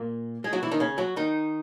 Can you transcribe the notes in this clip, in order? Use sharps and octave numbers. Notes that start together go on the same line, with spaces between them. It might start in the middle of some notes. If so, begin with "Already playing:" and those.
Already playing: A#2 A#3
G#3 G#4
F#3 F#4
E3 E4
D#3 D#4
C#3 C#4
F#3 F#4
D#3 D#4